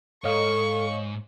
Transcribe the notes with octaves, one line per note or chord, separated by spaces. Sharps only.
G#2 A4 C#5 D#5 F5 C#6